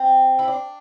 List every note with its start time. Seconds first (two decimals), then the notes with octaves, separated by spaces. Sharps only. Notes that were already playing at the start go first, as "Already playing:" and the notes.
Already playing: C4
0.39 E4
0.48 D4